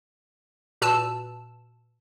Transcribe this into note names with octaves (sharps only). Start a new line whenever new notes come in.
A#2 F#4 B4 A5 E6 E7